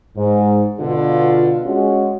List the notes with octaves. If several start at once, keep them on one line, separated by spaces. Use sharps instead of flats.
G#2
B2 D3 F4
G#3 C#4 F#4